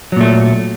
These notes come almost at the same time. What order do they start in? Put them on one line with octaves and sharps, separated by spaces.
F#3 A#2 A3